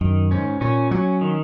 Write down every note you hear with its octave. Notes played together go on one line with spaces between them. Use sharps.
F#2 D#3
G#2 C#4
A#2 C#4
F#3 C#4
D#3